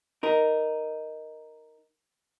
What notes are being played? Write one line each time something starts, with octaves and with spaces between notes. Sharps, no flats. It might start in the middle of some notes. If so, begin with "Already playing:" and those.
D#4 A#4